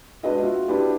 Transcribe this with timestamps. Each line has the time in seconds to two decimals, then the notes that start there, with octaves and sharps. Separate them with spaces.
0.23 G#3 D4 F#4 B4 D#5
0.42 F4 F#4 E5
0.68 D4 E4 F#4 G4 B4